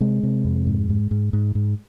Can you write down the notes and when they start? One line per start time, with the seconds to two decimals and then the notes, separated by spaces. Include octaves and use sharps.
0.01 C3 G#3
0.23 C3
0.45 F2
0.67 G#2
0.89 G#2
1.11 G#2
1.33 G#2
1.55 G#2